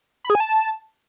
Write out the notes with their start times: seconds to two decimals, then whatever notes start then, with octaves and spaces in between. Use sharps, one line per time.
0.24 B5
0.30 G#4
0.35 G#5
0.40 A5